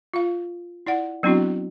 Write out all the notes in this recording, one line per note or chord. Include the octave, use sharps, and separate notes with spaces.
F4 F5
E4 D5 F#5
F#3 B3 C4 D4 E4 F#4